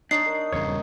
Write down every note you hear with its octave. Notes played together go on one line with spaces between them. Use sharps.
D4 D#4 C#5 C7
A#4
D#1 E2 G2 C#3 C#5